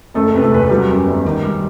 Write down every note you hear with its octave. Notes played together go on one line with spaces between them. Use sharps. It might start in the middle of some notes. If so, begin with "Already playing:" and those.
F#1 A3 A4
C3 B4
A3 A4
E2 B4
A4
F#3 G3 G4
F#2
G1
D#3
G3